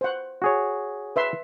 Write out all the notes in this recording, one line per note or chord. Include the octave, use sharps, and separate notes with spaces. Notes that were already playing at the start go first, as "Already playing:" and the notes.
C5 F#5
F#4 G#4 C#5
B4 E5 C6